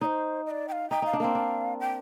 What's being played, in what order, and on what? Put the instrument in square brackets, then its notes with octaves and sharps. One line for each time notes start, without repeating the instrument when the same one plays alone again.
[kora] D#4 [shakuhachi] C5 D5
[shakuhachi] D#5
D5
G5
F5
[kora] D#4 [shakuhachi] G5
[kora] D#4 [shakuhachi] F5
[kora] D4
[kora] A#3 C4 [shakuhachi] F5
[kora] D4
[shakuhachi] G5